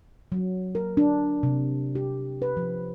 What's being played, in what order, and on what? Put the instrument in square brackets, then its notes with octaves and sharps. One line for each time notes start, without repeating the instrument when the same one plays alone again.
[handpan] F#3
A#4
D4
C3
G4
B4
F3